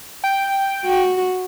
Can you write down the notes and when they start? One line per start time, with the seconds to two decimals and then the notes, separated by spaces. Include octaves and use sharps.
0.24 G5
0.85 F#4